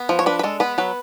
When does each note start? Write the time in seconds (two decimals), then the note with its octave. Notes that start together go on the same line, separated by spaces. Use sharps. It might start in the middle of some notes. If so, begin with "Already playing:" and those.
Already playing: B3
0.09 F3
0.19 C#5
0.26 D4 B4
0.39 B4
0.43 G#3 A4
0.60 B3 B4
0.78 F#3 B4